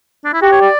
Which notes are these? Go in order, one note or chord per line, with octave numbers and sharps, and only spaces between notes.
D4
E4
F#4 G4
C#5
D5